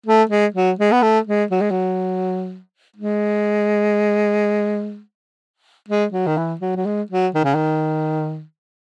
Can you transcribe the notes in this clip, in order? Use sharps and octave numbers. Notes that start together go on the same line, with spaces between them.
A3
G#3
F#3
G#3
B3
A3
G#3
F#3
G#3
F#3
G#3
G#3
F#3
D#3
E3
F#3
F#3
G#3
F#3
D#3
C#3
D#3